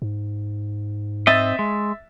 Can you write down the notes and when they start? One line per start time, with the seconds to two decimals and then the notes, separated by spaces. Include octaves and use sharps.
0.02 G#2
1.27 C4 D#5 E5 A6
1.59 G#3